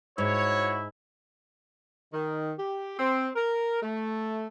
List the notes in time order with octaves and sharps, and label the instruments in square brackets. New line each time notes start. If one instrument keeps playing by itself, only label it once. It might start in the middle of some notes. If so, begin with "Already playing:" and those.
[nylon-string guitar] G#2 [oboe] E4 [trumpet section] F#4 C#5
[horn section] D#3
G4
C4
A#4
A3